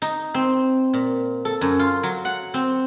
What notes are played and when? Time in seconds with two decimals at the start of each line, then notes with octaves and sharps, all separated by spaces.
0.02 D#4
0.34 C4
0.93 A#2
1.45 A4
1.61 F#2
1.79 F4
2.03 F#3
2.25 F#5
2.54 C4